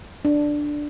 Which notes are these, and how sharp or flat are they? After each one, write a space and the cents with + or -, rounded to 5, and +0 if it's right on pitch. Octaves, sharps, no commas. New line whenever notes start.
D4 +5